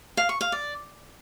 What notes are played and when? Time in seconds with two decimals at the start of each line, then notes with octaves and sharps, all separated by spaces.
0.17 F5
0.29 C#6
0.41 F5
0.52 D5